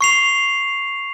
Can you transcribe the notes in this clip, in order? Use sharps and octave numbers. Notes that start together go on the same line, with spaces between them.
C#6 C7 F7